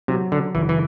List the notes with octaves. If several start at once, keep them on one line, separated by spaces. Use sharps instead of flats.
C3 F#3
D3
F#1 E3
E3